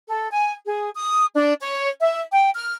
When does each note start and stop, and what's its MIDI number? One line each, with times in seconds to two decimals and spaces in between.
0.09 0.29 69
0.32 0.53 80
0.66 0.90 68
0.96 1.25 87
1.35 1.54 62
1.61 1.87 73
2.00 2.20 76
2.32 2.49 79
2.55 2.75 89